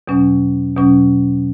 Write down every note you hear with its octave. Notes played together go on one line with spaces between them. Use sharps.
E2 B2 F#3 C#4
E2 B2 F#3 C#4